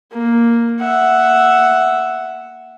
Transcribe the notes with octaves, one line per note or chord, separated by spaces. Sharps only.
A#3
E5 F#5